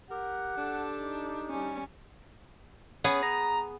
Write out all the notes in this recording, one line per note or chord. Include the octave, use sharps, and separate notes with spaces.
G4 A#4 F#5
D4 A4
D#4
G3 C#4
B3 C#4 G#4
A#5